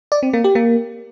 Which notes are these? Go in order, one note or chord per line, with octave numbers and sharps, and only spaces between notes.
D5
C4
A#3
G4
A#3